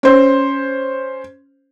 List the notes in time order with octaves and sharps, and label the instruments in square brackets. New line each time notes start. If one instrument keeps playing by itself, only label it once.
[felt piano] C#4 C5